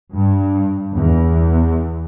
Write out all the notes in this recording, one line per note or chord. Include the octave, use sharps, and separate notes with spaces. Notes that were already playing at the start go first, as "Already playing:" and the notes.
G2
E2